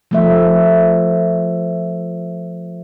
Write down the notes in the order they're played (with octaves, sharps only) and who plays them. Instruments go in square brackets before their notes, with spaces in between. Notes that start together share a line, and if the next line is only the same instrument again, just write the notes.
[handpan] F3 A3 E5